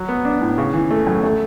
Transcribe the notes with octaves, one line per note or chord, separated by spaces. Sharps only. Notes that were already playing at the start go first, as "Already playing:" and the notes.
Already playing: F#3
B3
D4
A2
C#3
E3
A3
F#2
A3